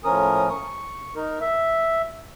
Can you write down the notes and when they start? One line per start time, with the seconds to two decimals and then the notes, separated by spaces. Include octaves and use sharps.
0.05 A2 F3 C#4 A#4 D#6
0.50 C#6
1.16 D#4 A#4
1.41 E5